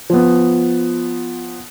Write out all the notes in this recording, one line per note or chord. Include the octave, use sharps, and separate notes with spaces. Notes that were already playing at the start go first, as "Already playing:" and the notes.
F3 B3